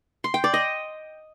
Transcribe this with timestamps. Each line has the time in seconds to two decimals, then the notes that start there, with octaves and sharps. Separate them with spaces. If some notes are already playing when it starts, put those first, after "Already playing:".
0.24 C6
0.34 G5
0.44 D5
0.54 D#5